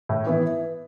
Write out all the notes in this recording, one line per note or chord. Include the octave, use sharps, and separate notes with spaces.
A2
E3 B3 E4